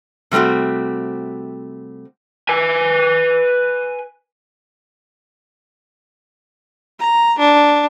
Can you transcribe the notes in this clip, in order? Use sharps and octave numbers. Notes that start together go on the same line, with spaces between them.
C3 G3 A3 C4 F#4
B4 G#5
A#5
D4